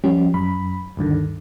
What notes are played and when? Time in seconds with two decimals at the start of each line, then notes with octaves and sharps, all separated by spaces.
0.04 F3 G3 C#4 G4
0.34 F#2 B5
0.97 D2 G2 D3 D#3